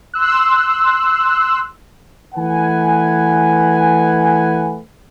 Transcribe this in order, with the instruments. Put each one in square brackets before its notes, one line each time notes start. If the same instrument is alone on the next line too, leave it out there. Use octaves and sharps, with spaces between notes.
[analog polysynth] C6 E6 F#6
[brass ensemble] E3 A3 B4 F#5 G#5